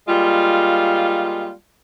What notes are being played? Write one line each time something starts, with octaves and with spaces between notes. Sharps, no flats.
G3 G#3 A#3 F4